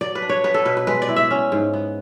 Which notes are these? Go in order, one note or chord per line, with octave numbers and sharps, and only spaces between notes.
F#3 D5
B4
D4
C#5
B3 B4
A4
B2 B4
B4
G#3 B4
D5
E4
E5
C#4
G#2
B3